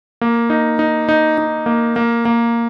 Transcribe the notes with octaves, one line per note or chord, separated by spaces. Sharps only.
A#3
D#4
D#4
D#4
D#4
A#3
A#3
A#3